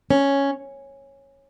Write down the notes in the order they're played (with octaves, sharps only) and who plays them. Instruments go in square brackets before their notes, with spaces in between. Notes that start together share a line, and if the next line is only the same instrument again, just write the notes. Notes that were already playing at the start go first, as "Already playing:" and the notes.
[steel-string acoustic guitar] C#4